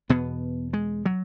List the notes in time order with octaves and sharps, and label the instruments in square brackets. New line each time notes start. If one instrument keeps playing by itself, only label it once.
[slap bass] E2 B2 B3
G#3
F#3